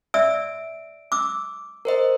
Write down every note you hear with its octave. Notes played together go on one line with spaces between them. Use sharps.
D5 E5 E6 D7
D6 E6
A#4 C5 D#5